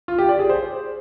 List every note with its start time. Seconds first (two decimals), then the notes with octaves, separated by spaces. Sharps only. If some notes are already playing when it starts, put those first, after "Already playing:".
0.08 F4
0.18 G4
0.29 D5
0.39 G#4
0.49 C5